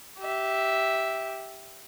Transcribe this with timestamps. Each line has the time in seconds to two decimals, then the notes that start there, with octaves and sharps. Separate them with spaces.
0.19 G4 E5